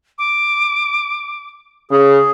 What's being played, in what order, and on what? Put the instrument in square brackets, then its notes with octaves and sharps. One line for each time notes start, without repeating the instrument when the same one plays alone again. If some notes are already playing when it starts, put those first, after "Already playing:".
[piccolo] D6
[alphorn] C#3 [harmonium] G#4